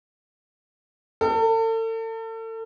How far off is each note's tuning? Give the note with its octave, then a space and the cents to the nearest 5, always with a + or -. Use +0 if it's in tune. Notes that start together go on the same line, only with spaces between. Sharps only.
A4 +40